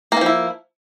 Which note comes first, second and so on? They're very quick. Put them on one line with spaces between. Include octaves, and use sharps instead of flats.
A#3 E3 F3 E4